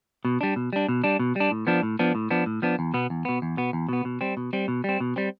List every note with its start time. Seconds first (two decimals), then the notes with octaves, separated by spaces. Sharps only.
0.25 B2
0.41 G3 D4
0.56 B2
0.73 G3 D4
0.89 B2
1.04 G3 D4
1.19 B2
1.36 G3 D4
1.51 A2
1.67 F3 B3 D4
1.83 A2
1.99 F3 B3 D4
2.15 A2
2.31 F3 B3 D4
2.46 A2
2.62 F3 B3 D4
2.79 E2
2.94 B2 B3
3.10 E2
3.25 B2 B3
3.42 E2
3.57 B2 B3
3.73 E2
3.89 B2 B3
4.05 B2
4.21 G3 C4
4.37 B2
4.53 G3 C4
4.68 B2
4.84 G3 C4
5.00 B2
5.16 G3 C4